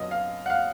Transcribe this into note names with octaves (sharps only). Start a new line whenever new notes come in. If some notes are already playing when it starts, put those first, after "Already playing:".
Already playing: F#2 D3 F#3 B3 D4 D#5
F5
F#5
F5